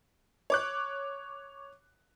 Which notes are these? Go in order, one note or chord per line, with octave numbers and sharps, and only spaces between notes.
C#5 D6 F#6